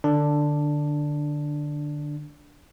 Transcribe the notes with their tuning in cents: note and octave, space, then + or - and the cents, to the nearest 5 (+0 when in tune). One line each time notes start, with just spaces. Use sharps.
D3 +20 D4 +0